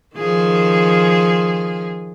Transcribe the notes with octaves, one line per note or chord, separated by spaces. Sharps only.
D#3 F3 G#4